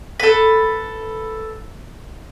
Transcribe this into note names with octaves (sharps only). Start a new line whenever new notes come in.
A4 B4